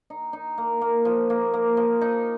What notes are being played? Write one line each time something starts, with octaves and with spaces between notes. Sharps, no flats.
D#4
D#4
A#3
A#3
F3
A#3
A#3
F3
D#4